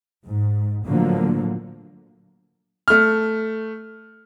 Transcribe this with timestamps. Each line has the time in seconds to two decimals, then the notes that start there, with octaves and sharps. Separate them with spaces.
0.25 G#2
0.85 A2 D3 F3 F#3 A#3
2.88 A3 F6